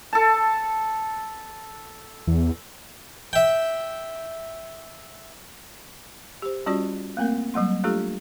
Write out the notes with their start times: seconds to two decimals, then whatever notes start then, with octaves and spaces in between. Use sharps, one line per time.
0.13 A4 A5
2.27 E2
3.33 E5 G5
6.42 G4 C5
6.66 G3 C#4 F4 F#4 D5
7.17 A3 A#3 C4 A#4
7.54 F#3 G3 A#3 C6
7.84 A3 D4 F4 G4 A4